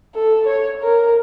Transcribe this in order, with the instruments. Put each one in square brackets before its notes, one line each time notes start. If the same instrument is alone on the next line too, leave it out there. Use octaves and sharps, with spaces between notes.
[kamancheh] A4
C#5
A#4